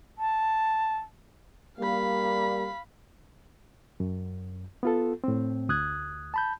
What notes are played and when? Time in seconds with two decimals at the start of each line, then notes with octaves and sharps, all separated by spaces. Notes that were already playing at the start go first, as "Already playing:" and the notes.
0.18 A5
1.79 G3 A#3 F5 B5
4.00 F#2
4.83 B3 F4 A4
5.24 A2 C4
5.69 D2 D#6 F#6 G#6
6.34 A5 B5 G6